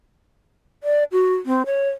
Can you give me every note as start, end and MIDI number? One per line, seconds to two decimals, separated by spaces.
0.83 1.04 74
1.12 1.35 66
1.46 1.63 60
1.66 1.90 73